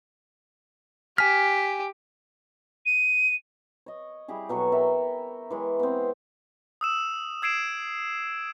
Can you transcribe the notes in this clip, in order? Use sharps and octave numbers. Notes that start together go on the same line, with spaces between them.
G4 G#5 F6 B6
D#7
C#5 D#5
G3 E4 G4 G#4
B2 F#3 A4 C#6
A#4 E5 G5
E3 G#3 C#5
B3 C4
D#6 E6 E7
E6 G#6 C7 D7 E7